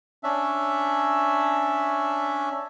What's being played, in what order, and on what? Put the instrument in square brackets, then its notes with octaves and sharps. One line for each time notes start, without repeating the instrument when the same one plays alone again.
[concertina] C#4 D4 E5